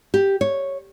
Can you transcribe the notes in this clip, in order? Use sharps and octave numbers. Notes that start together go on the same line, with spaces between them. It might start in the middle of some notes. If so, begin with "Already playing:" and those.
G4
C#5